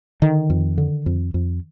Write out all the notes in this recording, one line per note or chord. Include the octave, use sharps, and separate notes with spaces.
D3 D#3
F2
D3
F2
F2